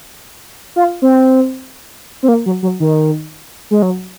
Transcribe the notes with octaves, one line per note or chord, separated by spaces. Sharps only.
F4
C4
C4
A#3
F#3
F#3
D#3
G#3
F#3